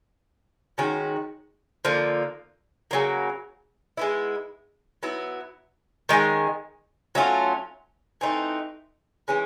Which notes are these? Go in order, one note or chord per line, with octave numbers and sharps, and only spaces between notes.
D#3 G#3 C#4 F#4
D3 F3 A#3
C#3 F#3 A#3
G#3 B3 E4
F#3 B3 E4
D#3 G#3 C#4
F#3 A3 C#4 F4
E3 A3 C4 D#4
E3 G#3 C#4